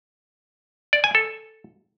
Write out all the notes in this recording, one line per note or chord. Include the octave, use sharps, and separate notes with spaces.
D5
G#5
A4